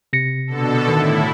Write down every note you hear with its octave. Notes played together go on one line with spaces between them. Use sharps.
C3 A#6 C#7
B2 D3 A4
A2 D#3 E4